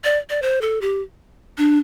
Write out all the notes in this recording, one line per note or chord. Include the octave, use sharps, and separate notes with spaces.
D5
D5
C5
A4
G4
D4